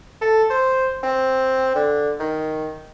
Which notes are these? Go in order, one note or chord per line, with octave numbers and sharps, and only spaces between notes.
A4
C5
C4
D3
D#3